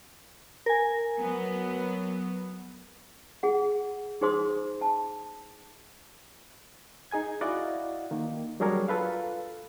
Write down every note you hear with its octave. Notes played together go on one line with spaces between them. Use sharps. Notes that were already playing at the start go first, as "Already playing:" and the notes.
A#4 G#5
F#3 B3
G#4 F#5
D#4 G#4 C5 C6 D#6
A5
D#4 G#4 G#5 G#6
E4 F#4 D5 D#5 F5 F#5
D#3 A#3
F#3 G3 D4 G#4 A#4 C#5
F4 A4 B4 F5